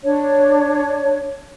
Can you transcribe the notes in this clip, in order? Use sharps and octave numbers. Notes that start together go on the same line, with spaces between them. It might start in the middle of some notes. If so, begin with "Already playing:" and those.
D4 C#5